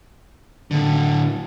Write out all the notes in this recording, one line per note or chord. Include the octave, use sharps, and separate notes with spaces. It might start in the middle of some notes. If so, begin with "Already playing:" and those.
A2 D3